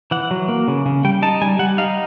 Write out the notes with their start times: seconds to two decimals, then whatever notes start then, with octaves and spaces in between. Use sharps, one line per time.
0.11 E3 F#5
0.31 F#3
0.48 A#3
0.68 C#3
0.86 C#3
1.05 G3 G5
1.22 D#4 A5
1.41 G3 G#5
1.59 G3 F#5
1.78 D#4 F5